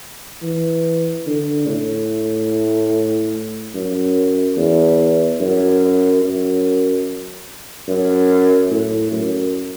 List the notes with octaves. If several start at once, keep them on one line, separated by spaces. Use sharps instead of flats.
E3
D3
A2
F#2
E2
F#2
F#2
F#2
A2
F#2